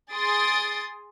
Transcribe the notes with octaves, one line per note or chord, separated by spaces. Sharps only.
G#4 C6 D#6 A6 D7